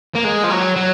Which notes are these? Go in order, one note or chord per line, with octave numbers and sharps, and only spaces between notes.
A#3
G#3
F3
F#3
F#3